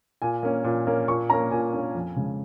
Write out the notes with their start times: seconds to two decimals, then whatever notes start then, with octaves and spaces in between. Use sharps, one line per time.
0.22 A#2 G#5
0.43 A#3 C#4
0.64 A#2
0.86 A#3 C#4
1.08 A#2 C#6
1.30 A#3 C#4 A#5
1.51 A#2 G#5
1.73 A#3 C#4
1.95 F2
2.16 C#3 G#3